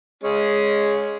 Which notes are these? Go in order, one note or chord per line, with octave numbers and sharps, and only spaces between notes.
G#3 C#4 G#4